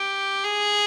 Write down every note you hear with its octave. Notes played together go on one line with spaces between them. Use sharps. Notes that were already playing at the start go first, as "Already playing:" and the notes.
Already playing: G4
G#4